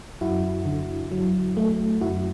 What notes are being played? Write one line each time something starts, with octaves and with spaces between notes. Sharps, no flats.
F#2 E4 F#4
D3
F#3
A3
F#2 E4 F#4